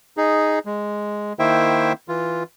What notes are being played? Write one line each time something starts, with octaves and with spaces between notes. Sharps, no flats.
D#4 G#4
G#3
D#3 A#3 E4 C5 E5 G5
E3 F4